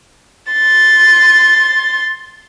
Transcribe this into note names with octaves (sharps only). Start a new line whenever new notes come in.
C6 A6